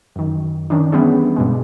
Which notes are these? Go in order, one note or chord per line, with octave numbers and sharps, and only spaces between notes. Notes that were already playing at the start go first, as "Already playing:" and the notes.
F#2 D#3
D#3 C#4 D4
E3 G3 B3 C#4 G#4
G2 B2 G#3